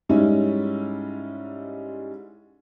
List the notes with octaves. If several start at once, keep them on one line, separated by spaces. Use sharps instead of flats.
G#2 G3 G#3 C#4 D#4 E4